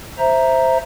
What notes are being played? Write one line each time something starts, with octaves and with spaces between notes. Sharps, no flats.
C5 E5 A#5